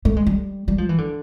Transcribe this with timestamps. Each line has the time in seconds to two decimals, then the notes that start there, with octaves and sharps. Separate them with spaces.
0.05 A3
0.17 G#3
0.27 G3
0.68 G3
0.78 F3
0.89 E3
0.98 D3